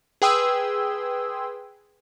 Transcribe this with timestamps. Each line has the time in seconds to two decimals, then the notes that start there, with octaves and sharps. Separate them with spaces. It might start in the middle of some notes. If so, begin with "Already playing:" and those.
0.22 G#4 B4 G5 C6 D#6 E6